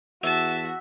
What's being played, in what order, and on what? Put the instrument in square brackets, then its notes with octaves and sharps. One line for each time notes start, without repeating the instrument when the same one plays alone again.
[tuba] E2 [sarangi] F#4 [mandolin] E5 [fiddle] A5